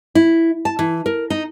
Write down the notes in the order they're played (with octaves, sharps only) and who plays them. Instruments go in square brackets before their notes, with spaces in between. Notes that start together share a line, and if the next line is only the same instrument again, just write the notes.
[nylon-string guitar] E4
A5
E3
A#4
D#4